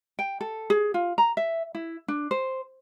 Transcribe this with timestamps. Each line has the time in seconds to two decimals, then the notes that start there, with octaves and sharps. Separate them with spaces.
0.19 G5
0.41 A4
0.70 G#4
0.94 F4
1.18 A#5
1.37 E5
1.75 E4
2.08 D4
2.31 C5